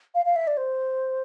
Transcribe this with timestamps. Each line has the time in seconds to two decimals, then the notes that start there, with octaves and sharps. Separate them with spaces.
0.15 F5
0.25 F5
0.36 E5
0.47 D5
0.57 C5